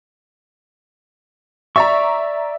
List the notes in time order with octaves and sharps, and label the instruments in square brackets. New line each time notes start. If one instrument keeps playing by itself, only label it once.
[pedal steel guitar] D5 C#6 [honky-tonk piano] E5 A#5